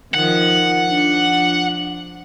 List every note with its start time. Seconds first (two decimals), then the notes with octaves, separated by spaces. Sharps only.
0.14 D#3 F3 F#5
0.86 F3 D4